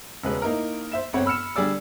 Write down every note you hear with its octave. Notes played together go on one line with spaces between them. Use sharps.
E1 C#3 G#3 B4
A#3 D#4 E4 A#4
C5 E5 E7
G1 C4 C#5 F#5
B5 E6 F6 C#7 E7
D3 G3 G#4 D5 E6